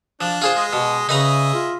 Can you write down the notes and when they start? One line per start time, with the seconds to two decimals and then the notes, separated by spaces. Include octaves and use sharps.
0.21 F3 D4
0.42 F4 G#4 C5
0.56 G#3 D#5
0.73 B2
1.09 C#3 D#4 G#4 B4 D#5 E5 A#5
1.54 F4